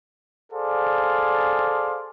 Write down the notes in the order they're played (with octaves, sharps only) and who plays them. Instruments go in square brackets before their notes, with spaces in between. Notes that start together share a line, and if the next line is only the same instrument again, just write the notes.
[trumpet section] G#4 A4 C5 D5 F5